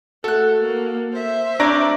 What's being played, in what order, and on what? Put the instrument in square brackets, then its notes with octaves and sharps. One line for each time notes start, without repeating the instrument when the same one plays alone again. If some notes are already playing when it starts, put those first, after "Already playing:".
[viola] A3 [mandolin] F#4 F#6 [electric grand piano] A4
[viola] A#3
C5 E5
[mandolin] A3 C4 C#5 [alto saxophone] D4 [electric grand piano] D5 A#5 A#6